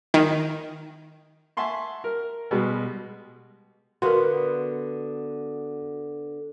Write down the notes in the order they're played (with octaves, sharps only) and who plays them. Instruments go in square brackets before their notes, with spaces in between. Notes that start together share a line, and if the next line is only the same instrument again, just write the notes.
[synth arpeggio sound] D#3
[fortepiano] E5 F#5 G#5 A5 C6 C#6
A#4
B2 G3 G#3
[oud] D3 B3 F5 [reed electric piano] F#4 [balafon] A#4 C6